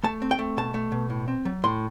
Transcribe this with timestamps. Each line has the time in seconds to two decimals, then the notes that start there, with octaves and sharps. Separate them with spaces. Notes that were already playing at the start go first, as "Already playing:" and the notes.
0.03 A3 A5
0.22 C4
0.31 G5
0.39 A3
0.57 B2 A5
0.74 A3
0.92 B2
1.10 A2
1.28 C4
1.45 F#3
1.64 A2 C6